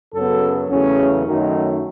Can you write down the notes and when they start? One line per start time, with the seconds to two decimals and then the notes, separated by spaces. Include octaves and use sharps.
0.14 F#2 C#3 F#3 B3 A4
0.70 E2 C#3 F#3 A3 C#4
1.26 F#2 D#3 F#3 A3 D#4